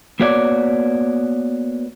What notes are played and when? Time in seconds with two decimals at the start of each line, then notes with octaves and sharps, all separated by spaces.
0.20 A#3 B3 F#4 C#5 D5